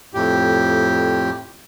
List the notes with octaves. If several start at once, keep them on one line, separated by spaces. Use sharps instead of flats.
F2 A2 G4